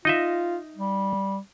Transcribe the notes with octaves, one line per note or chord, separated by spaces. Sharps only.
D#4 F4 D#5 E5
G3